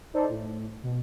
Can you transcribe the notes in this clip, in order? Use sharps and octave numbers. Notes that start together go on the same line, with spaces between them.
D#4 A4 C5 D5
A2
B2